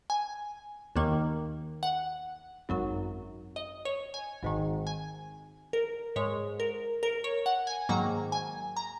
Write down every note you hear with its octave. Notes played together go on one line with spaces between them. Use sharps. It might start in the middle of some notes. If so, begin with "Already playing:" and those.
G#5
D#2 D#3 A#3
F#5
G#1 F#2 F#3
D#5
C#5
G#5
G#1 G#2 D#3
G#5
A#4
G#2 G#3 C#5
A#4
A#4
C#5
F#5
G#5
G#2 D#3 F#3 A#3 A#5
G#5
A#5